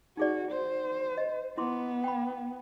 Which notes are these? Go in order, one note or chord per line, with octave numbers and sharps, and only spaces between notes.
D#4 F#4 G#4 D5
C5
D#5
B3 E4 C6 D6
G5 B5